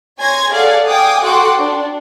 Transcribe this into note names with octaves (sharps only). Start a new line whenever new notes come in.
C#5 G#5 C6 G#6 A#6
G#4 A4 D5 F5 F#5 G#5
F5 G5 G#5 D6 D#6
F#4 A4 F#5 G5 C6 D6
D4